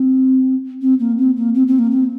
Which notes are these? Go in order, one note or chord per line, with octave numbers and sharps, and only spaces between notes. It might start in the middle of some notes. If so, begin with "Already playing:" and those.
Already playing: C4
C4
A#3
C4
A#3
C4
C4
A#3
C4